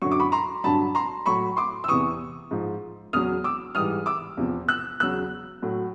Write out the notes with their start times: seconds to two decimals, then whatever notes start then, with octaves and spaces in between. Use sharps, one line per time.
0.02 F#2 D3 F#3 C#6
0.12 D6
0.20 B5 C#6
0.32 A#5 C6
0.64 G2 D3 F#3 A5 B5
0.95 A#5 C6
1.26 A2 F#3 B5 C#6
1.57 C6 D6
1.84 E6
1.88 E2 C3 E3 C#6 D#6
2.51 G#2 F3
3.13 E2 C#3 F#3 D#6 F6
3.44 D6 E6
3.75 G#2 E3 G3 D#6 F6
4.06 D6 E6
4.37 E2 C3 F3
4.68 E6 F#6
5.00 E2 C#3 F#3 E6 F#6
5.63 A2 F#3